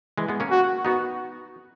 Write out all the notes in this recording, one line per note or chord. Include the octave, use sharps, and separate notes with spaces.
E3 G#3
G#3 B3
A#3 C#4
F#4
B3 D#4 F#4